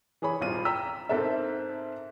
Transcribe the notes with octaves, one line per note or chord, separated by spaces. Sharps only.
E3 G#4 C#5 B5
D#1 G#1 F4 D#7
G5 A#5 E6 B6
G#2 C4 A4 A#4 E5